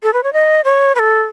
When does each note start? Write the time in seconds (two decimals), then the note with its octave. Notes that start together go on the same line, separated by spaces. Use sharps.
0.03 A4
0.13 B4
0.23 C#5
0.33 D#5
0.65 C#5
0.95 B4
0.99 A4